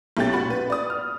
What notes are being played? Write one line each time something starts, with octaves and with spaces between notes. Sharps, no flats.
B1 B2 A3 C#4 G4 A6
A#2 F#4 F#5 B5 F#7
B4
D5 D#6
F6